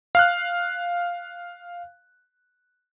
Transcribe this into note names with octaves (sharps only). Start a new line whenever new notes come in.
F5 F6 F#6